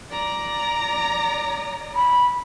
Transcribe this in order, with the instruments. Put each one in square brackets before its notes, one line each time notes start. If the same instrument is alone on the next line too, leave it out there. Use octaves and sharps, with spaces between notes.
[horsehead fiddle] D5 A#5
[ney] B5